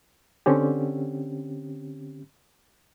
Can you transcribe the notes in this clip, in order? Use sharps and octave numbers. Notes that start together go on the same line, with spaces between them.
D3 C4 C#4 G4